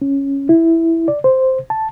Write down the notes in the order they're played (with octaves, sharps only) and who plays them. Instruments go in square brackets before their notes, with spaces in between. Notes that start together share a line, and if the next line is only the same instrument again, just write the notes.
[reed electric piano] C#4
E4
D5
C5
A5